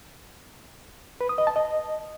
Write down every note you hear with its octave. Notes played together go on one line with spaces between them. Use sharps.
B4
D#6
D#5
A5
D#5